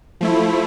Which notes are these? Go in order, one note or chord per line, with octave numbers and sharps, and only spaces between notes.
F3 A3 E4